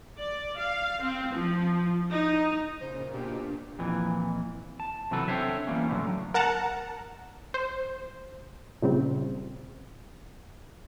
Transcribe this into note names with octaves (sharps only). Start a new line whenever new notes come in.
D5
F5
C4
F3
D#4
A#2 C#3 C5
B2 D4 G4
F2 A#2 E3
A5
C3 E3 F#3 A4 B4
C4 D4 A4 C5 C#5 E5
E3 G3 A#3 C#4
A2 D3 F3 F#3
A#4 F#5 A5 A#5
C5
A#2 C#3 G3 C4